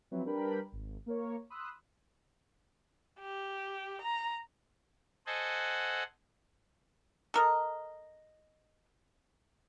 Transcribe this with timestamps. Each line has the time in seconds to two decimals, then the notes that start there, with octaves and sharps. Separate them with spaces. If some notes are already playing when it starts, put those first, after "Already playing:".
0.11 F3 F#3 C4 E4 B4 C#5
0.25 G3 D4 A#4 B4 G5 B5
0.72 G#1
1.06 A#3 A#4 C#5
1.50 B5 C6 D#6 E6 F#6
3.20 G4
4.01 A#5
5.27 A4 C5 D#5 F#5 G#5
7.34 A4 A#4 D#5